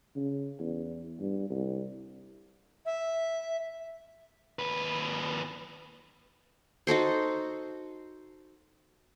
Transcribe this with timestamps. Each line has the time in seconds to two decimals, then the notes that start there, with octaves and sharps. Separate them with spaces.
0.16 C#3
0.59 E2
1.19 G2
1.50 C2
2.86 E5
4.59 D#2 B4
6.87 D#4 F#4 A4 C5